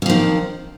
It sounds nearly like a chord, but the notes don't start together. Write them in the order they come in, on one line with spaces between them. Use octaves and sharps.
F2 F3 D#3